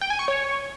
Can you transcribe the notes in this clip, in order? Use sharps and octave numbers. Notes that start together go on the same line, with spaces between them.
G5
G#5
C#6
C#5